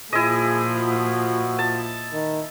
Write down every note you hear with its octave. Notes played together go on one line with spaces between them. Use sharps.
A#2 F3 E4 G#4 D#5
F#4
A5
D#3